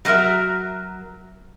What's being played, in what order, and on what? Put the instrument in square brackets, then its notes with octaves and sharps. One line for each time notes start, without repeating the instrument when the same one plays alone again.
[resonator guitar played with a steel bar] F#3 G3 F#4 A#4 E5